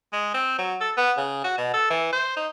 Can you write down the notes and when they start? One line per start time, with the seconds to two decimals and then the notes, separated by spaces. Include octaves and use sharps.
0.13 G#3
0.34 C4
0.58 F#3
0.81 A4
0.97 B3
1.17 C#3
1.44 F#4
1.58 B2
1.74 A4
1.90 E3
2.13 C5
2.37 D#4